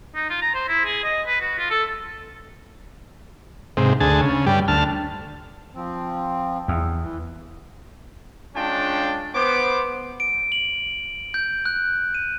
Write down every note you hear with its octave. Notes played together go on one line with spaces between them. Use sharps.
D#4
F4
A#5
C5
E4
G#4
D#5
B4
F#4
F4
A4
G#2 C3
D2 G#4 A5
C#3
G2 G3
D2 A5 F6
F3 C4
E2
E3
G#3 C#4 D4 F4 G5 A5
B3 C5 D6
D7
F#7
G6
F#6
D#7